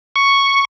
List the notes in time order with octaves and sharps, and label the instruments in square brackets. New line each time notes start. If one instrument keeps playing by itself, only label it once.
[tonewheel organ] C#6